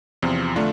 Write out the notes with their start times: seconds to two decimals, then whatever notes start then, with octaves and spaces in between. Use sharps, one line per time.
0.22 E2 C3 F3 C4
0.56 D3 A3 D4 F4